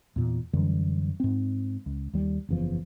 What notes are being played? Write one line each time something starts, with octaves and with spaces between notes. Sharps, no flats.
E2 A#2
F#2 D3 E3 G3
G#2 C4
C#2
D#2 G3
F#1 E2 F3